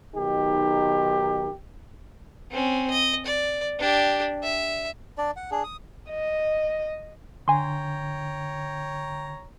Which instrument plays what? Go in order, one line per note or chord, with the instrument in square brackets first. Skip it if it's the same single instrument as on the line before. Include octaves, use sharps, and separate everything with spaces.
[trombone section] B1 D#3 D#4 G4
[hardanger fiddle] C4 C#4
D#5
D5
D4 G4
E5
[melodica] D4 D5
F#5
D4 G#4
D#6
[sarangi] D#5
[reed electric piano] D3 [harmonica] C#5 G5 A#5 [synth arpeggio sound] G#5 C6